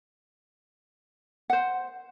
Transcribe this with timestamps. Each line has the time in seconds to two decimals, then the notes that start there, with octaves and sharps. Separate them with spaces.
1.50 C5 F#5